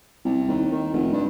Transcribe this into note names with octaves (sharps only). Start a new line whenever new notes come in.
C2
D#2
D#3
F1
G2